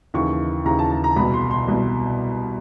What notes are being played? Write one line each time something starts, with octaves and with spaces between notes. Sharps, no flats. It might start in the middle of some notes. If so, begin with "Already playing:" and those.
D#2 C#3 E3 C#6
D#2 C#3 E3 A#5
A5
A5
A#5
C2 B2 B5
C6
C6
C2 B2